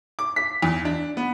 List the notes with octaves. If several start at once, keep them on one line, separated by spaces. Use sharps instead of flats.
D6
B6
E2
D4
B3